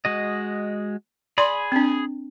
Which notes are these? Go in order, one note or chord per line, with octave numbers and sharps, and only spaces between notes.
G#3 F#4 D#5
G#4 D5 B5 C6
C4 D4